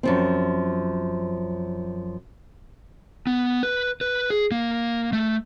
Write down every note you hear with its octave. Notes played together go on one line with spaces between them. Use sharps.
F#2 F3 C4
B3
B4
B4
G#4
A#3
A3